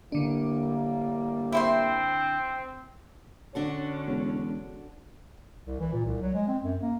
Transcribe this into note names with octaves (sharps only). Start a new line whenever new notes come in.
A2 D3 G3 A#3 D4
C4 E4 C5 C6
D3 C#4 D4 F#4 A4 C#5
E1
C2
E3
A#2
C2
F#3
G#3
C4
F#2
A#3